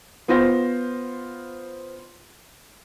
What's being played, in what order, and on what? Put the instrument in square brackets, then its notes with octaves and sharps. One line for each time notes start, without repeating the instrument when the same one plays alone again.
[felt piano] B3 F4 C5 A#6